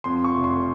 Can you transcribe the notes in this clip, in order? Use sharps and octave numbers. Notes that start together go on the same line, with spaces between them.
F2 C6
C#6
F1
C6